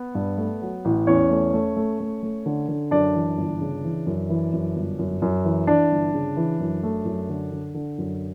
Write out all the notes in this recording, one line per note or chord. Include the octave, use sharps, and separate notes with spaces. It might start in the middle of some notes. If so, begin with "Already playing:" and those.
Already playing: B3
G2
A3
F#3
A1
E2 C#4 C#5
A3
A3
A3
A3
A3
D3
D3
F#2 D4 D5
E3
G1
C#3
E3
F#2
E3
F#2
G1
F#2
F#2
E3
E3 D4 D5
G1
C#3
E3
F#2
A3
F#2
D3
D3
D3
F#2